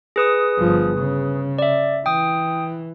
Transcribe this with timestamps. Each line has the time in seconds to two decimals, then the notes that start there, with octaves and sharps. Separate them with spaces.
0.16 G#4 B4 D#6
0.59 G1 F3
0.97 C#3
1.59 D5 E5
2.06 E3 G5 D#6